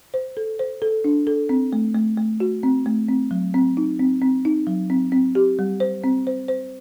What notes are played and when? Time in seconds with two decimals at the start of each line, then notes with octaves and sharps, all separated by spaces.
0.14 C5
0.37 A4
0.59 C5
0.82 A4
1.04 D4
1.27 A4
1.49 C4
1.73 A3
1.94 A3
2.18 A3
2.40 F#4
2.63 C4
2.86 A3
3.08 C4
3.31 F#3
3.54 C4
3.77 D#4
3.99 C4
4.22 C4
4.45 D#4
4.67 F#3
4.90 C4
5.12 C4
5.35 G4
5.59 G3
5.80 C5
6.04 C4
6.27 C5
6.48 C5